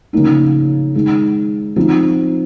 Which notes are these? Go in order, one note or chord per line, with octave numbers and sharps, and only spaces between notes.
C#3 F3 A#3 D#4
D#3 G#3 D#4
F3 C4 D#4